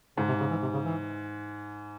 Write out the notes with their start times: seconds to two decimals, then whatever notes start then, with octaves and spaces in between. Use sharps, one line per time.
0.17 G#2 C#3
0.28 C3
0.40 C#3
0.51 E3
0.62 C3
0.74 C#3
0.85 E3